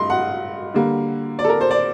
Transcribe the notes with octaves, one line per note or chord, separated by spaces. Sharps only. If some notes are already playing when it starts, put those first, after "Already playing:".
Already playing: G2 A3 D#5 C6
F#5
D3 G3 A#3
D5
A4
A#4
C5
D5